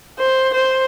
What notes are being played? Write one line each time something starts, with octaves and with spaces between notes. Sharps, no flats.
C5
C5